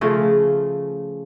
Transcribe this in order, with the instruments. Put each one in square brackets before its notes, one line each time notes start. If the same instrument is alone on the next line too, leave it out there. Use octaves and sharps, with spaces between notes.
[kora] C#3 F3 A3 G#4